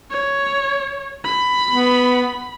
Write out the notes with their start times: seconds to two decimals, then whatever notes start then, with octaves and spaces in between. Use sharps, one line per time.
0.11 C#5
1.24 B5
1.70 B3